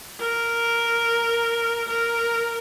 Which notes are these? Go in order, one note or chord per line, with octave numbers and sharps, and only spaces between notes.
A#4
A#4